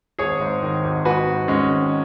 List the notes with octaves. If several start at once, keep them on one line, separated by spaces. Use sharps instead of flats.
G#1 G#4 C#5
G#2
D#3
G#1
G#2 F#4 B4
G#2
G#1 G#3 C#4
D#3